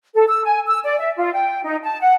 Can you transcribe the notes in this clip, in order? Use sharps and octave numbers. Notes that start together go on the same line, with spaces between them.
A4
E6
G#5
E6
D5
E5
F4
G5
D#4
A5
F#5